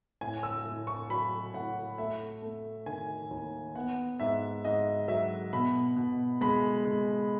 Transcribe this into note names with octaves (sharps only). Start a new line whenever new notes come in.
A2 G#5
E6
A2
C#6
F#3 B5
A2 F#5
A3 E5
A3
D#3 G#5
D#2
B3 F#5
G#2 E5
G#2 D#5
F#3 E5
B2 B5
B2
G#3 B5
G#3